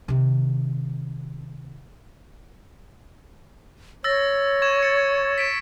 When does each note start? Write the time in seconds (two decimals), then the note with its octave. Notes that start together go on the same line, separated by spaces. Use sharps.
0.08 C3 D#3
4.04 C#5 E6 A6 A#6
4.62 C#6 G#6 E7
4.83 A6 C#7
5.38 B6 D7 E7